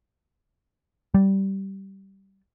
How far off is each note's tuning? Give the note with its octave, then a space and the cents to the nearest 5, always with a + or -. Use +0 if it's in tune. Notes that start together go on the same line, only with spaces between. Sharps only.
G3 -15